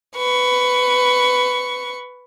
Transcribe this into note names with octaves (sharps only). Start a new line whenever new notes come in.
B4 C#6